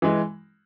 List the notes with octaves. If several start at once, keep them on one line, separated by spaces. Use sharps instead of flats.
E3 G#3